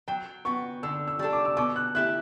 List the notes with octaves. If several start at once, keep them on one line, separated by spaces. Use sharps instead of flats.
F#3 G5
B3 F#4 C#6
D3 E6
E6
G3 D4 A4
D6
E6
B2 D6
F#6
A3 E4 G4 F#6